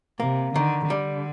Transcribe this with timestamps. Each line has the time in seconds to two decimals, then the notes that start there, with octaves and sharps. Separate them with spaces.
0.20 C3 A#3
0.54 D3 D#3
0.90 D3 G3